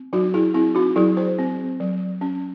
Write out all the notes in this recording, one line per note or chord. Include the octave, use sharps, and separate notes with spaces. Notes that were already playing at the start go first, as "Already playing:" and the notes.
Already playing: C4
F#3 D#4 F#4
E4 G#4
C4 E4 G#4
D#4 F#4
F#3 E4 G#4
G#4 C5
C4
F#3
C#4